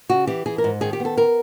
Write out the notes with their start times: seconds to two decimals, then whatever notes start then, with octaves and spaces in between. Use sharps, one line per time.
0.09 C#3 F#4
0.27 E3 G4
0.46 E3 G#4
0.58 A#4
0.64 G#2
0.81 D#3 G#4
0.93 G4
1.00 B3 A4
1.18 A#4